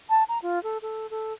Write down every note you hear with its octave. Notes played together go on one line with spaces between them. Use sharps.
A5
A#5
F4
A4
A4
A4